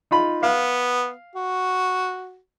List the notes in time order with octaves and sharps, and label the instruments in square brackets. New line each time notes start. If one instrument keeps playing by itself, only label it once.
[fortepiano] D#4 F4 B5
[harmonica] B3 [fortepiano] F5
[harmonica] F#4